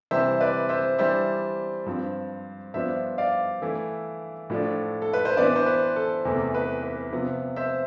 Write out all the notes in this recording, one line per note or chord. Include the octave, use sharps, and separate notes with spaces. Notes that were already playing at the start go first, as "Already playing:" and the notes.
C3 E3 G3 C5 E5
B4 D5
C5 E5
E3 G3 D4 C5 E5
G2 F3 C4
G2 F3 B3 D4 C5 E5
D5 F5
E3 A3 E4
A2 F3 A3 D4
A4
B4
C5
E3 B3 D4 B4 D5
C5
B4
A4
E2 C3 E3 A3
B4
B4
C3 F3 B3
C5 E5